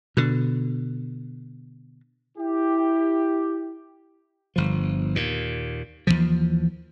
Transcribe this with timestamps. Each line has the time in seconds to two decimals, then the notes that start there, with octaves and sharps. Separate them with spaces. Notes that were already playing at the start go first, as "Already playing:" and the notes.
0.17 B2 D3
2.38 E4 G4
4.56 G1 F3
5.15 D#2 A#2
6.07 D#2 C#3 E3 F3